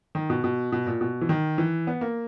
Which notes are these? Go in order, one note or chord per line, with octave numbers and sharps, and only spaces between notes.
D#3
B2
B2
B2
A#2
B2
E3
D#3
E3
B3
A#3